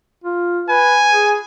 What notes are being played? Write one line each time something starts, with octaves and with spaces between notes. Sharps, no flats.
F4
B4 G#5
G#4